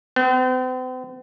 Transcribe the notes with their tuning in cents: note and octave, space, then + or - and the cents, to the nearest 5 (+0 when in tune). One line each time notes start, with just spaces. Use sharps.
C4 -45